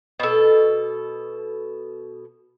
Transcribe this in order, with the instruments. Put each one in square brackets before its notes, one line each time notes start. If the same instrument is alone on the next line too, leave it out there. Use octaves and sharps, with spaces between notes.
[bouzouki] B2 A4